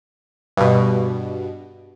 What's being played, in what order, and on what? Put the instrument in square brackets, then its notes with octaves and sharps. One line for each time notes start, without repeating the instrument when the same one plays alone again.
[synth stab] G2 B2